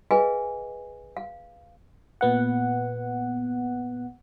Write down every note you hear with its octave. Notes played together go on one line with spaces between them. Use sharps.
G#4 B4 D#5 F5 G#5
F5
A#2 B3 F#5